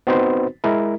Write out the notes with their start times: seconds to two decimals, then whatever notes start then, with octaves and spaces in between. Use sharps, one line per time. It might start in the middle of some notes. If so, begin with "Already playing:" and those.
0.07 B3 C4 D#4 F#4 B4 C5
0.64 G#3 E4 A#4